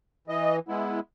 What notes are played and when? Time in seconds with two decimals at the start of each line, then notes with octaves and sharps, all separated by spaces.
0.28 E3 D#5
0.68 G#3 B3 E4